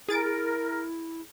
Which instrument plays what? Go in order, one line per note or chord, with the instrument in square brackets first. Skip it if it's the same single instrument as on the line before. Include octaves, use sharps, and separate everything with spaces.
[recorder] E4 [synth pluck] G#4 A6 D7 [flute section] A#4